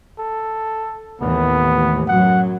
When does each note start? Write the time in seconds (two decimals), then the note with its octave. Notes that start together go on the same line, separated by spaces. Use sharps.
0.19 A4
1.21 D#2 A2 E3 B3
2.08 F#2 F#3 F#5